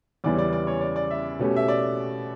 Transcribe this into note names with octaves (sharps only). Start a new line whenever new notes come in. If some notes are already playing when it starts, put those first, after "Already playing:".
E2 C#3 E3 G3 C#4 D5
D5
D5
C#5
D5
D5
E5
B2 A3 C#4 G4
E5
D5